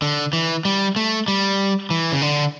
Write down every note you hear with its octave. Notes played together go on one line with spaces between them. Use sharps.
D3
E3
G3
A3
G3
E3
C#3
D3